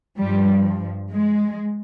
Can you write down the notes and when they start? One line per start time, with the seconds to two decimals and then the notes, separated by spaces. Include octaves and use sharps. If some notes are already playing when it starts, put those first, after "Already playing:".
0.18 G2 F3 G3
1.12 G#3